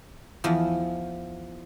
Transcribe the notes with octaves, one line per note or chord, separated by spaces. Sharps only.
E2 F3